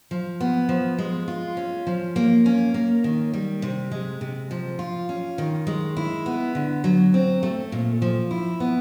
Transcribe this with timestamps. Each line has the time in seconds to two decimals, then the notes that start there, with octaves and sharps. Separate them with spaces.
0.11 F3
0.40 B3
0.69 F3
0.98 G#3
1.28 F4
1.57 C#4
1.87 F3
2.16 A#3
2.46 C#4
2.74 A#3
3.04 D#3
3.33 G3
3.62 C3
3.91 G#3
4.21 C3
4.51 F3
4.79 F4
5.09 C#4
5.38 D#3
5.67 G#3
5.97 E4
6.26 B3
6.55 D3
6.84 F#3
7.14 C4
7.43 A3
7.72 A#2
8.02 F3
8.31 E4
8.60 B3